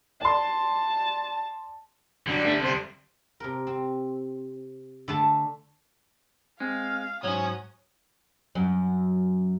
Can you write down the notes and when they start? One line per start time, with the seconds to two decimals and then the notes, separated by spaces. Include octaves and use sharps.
0.21 D5 A5 C6
2.27 D3 F#3 G3 D4
2.43 G2 A3 D4
2.59 C3 C5
3.40 C3 A#4
3.67 C4
5.08 D3 A3 A5
6.60 G#3 C4 F5
7.24 G#2 F#3 C5 C#5 G#5 D#6
8.55 F#2